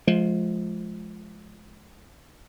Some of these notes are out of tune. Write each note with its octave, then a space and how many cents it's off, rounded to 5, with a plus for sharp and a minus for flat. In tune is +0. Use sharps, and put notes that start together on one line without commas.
F3 +0 G#3 +30